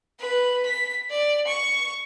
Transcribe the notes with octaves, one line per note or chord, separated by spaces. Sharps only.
B4
B6
D5
C#6